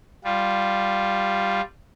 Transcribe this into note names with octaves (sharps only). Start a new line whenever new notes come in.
G3 F4